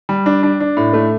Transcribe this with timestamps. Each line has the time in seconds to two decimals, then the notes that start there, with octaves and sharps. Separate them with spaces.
0.09 G3
0.26 D4
0.43 D4
0.60 D4
0.77 A2
0.93 A3